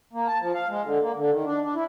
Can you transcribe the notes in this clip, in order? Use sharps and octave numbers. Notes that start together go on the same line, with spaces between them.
A#3
A5
F3
F5
G#3
D3
A#3
D3
D#3
D4
D4
E4